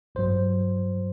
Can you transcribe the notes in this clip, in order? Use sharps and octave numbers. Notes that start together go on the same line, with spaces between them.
A1 G2 F#3 C5